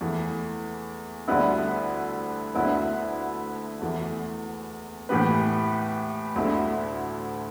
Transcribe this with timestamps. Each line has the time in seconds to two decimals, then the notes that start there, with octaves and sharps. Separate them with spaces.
0.01 E2 E3 A3
1.28 D2 D3 G3 B3 E4
2.55 D2 D3 B3 E4 B4
3.81 E2 E3 A3
5.09 A2 E3 B3 G4 B4
6.36 D2 D3 B3 E4 A4